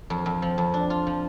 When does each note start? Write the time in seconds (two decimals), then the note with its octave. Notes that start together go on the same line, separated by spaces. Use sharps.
0.10 F2
0.26 F2
0.42 F3
0.58 F2
0.74 D4
0.90 F4
1.07 F3